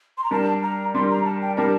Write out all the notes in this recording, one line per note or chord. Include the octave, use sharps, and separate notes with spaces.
C6
A#5
G3 D4 G4 A#4 A5
A#5
G3 D4 G4 A#4 C6
A#5
A5
G5
G3 D4 G4 A#4 A5